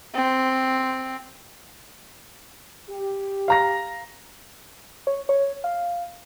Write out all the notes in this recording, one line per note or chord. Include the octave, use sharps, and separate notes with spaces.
C4
G4
F5 A#5 A#6
C#5
C#5
F5